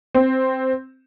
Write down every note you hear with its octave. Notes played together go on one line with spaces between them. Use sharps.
C4